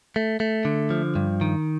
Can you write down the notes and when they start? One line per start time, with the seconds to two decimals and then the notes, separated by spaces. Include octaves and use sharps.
0.16 A3
0.40 A3
0.65 D3
0.90 F3
1.15 G2
1.41 D#3